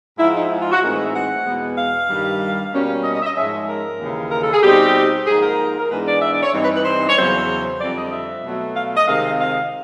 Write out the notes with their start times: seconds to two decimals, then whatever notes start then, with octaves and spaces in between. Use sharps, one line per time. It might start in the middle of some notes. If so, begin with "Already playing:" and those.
0.18 G#2 F3 G#3 E4
0.34 D#4
0.50 E4
0.61 F4
0.72 F#4
0.82 A2 E3 G#3 C4 D#4 A#4
0.92 B4
1.03 E5
1.14 F#5
1.46 E2 B2 G#3 B3
1.77 F5
2.09 G2 D#3 G3
2.73 B2 G3 A#3 C#4
3.04 D#5
3.15 D#5
3.21 E5
3.25 D#5
3.36 G#2 F3 G#3 C#4 E5
3.68 A#4
3.99 D#2 C#3 E3
4.31 A#4
4.42 A4
4.53 G#4
4.63 B2 G3 C4 D#4 G4
5.27 G#2 F3 A#3 D#4 G#4
5.42 A#4
5.78 A#4
5.90 G#2 E3 G#3 B3 D4 B4
6.06 D5
6.22 E5
6.32 D5
6.43 C#5
6.54 G2 E3 G3 C4 D#4
6.64 B4
6.75 B4
6.85 C5
7.08 C#5
7.17 E2 C#3 F#3 C5
7.81 F2 D3 G3 C4 D5
7.97 D#5
8.13 E5
8.44 B2 F#3 A3
8.76 F5
8.97 D#5
9.08 C3 D#3 G#3 C4 F5
9.39 F5